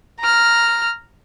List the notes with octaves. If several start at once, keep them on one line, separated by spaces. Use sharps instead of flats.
A#5 F6